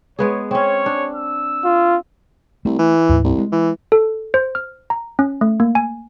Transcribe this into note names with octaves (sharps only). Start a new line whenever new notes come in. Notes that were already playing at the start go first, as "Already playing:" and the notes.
G#3 B3 G#4 C#5
C4 C#4 C#5
D4
E6
F4
C2 A3
E3
D2 G#2
C2
G#3
E3
A4
C5
F6
A#5
C#4
A3
A#3
G#5